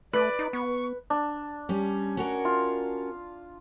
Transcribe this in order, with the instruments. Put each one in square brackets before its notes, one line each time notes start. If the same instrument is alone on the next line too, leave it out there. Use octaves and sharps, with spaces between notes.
[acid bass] A3 [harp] B4 [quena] D5
[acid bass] D#4
[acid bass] B3 [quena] C#6
[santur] D4
[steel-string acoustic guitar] G3 C#4
C#4 F#4 A#4
[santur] F4